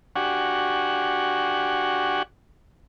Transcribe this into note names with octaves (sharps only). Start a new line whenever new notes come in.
D4 F#4 G4 F#5 G#5 C#6